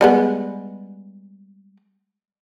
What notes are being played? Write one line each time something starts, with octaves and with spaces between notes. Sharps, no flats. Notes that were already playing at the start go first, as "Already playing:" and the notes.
G3 G#3 B3